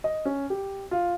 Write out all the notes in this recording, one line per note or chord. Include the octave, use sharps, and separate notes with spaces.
D#5
C#4
G4
F4